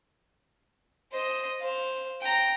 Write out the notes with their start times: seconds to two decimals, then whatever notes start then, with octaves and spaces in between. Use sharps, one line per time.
1.12 C5 D#5
1.60 C5 F5
2.21 G5 A#5